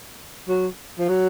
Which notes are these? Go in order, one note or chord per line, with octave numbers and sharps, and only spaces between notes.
F#3
F3
F#3